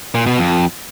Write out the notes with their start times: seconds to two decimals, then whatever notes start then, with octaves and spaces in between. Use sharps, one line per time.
0.15 A#2
0.26 B2
0.38 F2